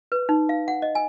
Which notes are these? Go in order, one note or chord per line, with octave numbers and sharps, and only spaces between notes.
B4
D#4
F5
F#5
D#5
G#5